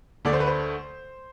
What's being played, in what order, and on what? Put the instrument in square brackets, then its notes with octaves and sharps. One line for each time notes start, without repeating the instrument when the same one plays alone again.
[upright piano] D2 D3 A3 D5
C5
B4
C5